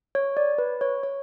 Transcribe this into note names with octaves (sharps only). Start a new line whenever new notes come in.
C#5
D5
B4
C#5
C#5